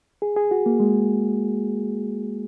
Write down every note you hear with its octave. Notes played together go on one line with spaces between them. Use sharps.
G#4
G#4
F#4
A#3
G#3